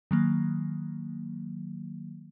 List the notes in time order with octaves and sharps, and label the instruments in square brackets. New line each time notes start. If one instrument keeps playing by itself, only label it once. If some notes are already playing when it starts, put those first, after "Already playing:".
[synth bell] D#3 F#3 A#3